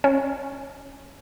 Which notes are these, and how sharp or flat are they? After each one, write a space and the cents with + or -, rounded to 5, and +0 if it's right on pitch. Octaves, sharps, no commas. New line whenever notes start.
C#4 +0